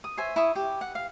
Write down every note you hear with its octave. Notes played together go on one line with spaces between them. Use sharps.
D#6
C5 C#5 E5 G#5
E4 C#6 D#6
G4
F#5
F5